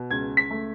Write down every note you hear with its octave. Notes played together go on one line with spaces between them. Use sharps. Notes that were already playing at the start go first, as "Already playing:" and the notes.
Already playing: B2
C#2 G#6
B6
A3